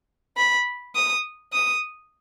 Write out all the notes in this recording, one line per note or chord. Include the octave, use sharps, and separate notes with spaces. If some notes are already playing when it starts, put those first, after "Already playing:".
B5
D#6
D#6